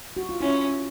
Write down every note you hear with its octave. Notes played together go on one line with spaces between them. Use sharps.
F#4
F4
C#4 E4